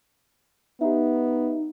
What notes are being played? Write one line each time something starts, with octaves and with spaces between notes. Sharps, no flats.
B3 D#4 G4 E5